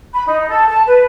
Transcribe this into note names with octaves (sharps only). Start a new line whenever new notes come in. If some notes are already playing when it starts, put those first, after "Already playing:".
B5
D#4
A4
A5
B4